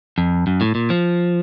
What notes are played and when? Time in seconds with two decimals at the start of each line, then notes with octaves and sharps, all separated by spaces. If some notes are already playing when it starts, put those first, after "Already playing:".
0.18 F2
0.47 F#2
0.61 A2
0.75 A#2
0.90 F3